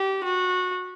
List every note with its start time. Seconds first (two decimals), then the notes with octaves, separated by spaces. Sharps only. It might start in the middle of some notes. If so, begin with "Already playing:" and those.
Already playing: G4
0.24 F#4